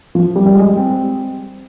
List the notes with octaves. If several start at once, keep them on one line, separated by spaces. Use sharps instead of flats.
F3
G3
G3
G#3
C4